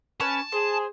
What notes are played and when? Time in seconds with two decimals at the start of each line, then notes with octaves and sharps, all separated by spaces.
0.20 C#4 B4 G#5 A5
0.52 G#4 C5